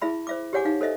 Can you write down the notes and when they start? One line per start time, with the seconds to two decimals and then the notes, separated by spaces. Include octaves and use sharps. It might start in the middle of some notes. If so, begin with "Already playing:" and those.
0.02 E4 G#4 E5 B5
0.27 C5 E5 D6
0.53 G4 G#4 C#5 F#5 G#5 D6
0.65 D#4 F5
0.81 A4 C5 D#5 E5